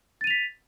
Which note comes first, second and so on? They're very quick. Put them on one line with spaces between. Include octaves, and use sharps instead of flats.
A6 D#7 F7 B6